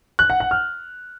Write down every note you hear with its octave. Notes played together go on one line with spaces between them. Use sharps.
F#6
F#5
F#5
F6